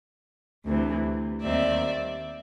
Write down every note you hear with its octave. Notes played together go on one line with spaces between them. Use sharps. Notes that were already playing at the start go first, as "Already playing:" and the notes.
D2 C3 E3
D#2 D#3 G3 C4 D5 E5